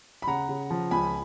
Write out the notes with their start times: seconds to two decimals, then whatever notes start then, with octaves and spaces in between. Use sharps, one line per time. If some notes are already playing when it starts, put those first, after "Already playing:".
0.22 B5
0.27 C#3 F#5 A#5
0.49 C#3
0.70 F3
0.91 C#2 G#5 B5